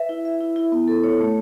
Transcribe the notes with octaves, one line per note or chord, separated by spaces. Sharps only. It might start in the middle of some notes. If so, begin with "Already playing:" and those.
Already playing: B4 E5
E4
E5
E4
E4
B3
A4
C#5
A3